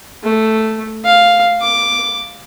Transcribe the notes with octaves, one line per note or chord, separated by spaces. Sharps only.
A3
F5
D6